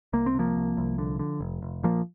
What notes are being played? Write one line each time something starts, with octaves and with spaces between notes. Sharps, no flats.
C2 A#3
C4
C3 F3 A#3
C2
C2
D3
D3
F1
F1
A#1 F3 A#3